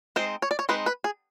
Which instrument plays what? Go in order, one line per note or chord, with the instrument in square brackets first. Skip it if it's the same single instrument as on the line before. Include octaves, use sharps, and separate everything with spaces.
[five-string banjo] G#3 C4 D#4 C5
C#5
D5
C#5
G#3 C4 D#4 B4
B4
G#4